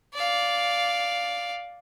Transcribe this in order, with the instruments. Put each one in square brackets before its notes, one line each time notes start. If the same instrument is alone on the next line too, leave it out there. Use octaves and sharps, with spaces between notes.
[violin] D5 F5